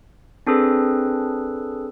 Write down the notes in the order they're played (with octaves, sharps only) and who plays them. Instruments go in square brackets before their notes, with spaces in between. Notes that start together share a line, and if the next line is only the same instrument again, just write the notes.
[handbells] C4 D4 G#4 A4 B4